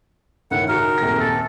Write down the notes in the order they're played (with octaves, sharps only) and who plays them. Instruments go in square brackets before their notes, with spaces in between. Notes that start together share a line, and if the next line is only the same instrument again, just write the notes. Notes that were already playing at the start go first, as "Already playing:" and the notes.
[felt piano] C#2 A2 D#3 [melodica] F#5
[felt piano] D#4 F#4 G#4 [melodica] A#4
[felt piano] D#1 F2 A#6
[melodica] A4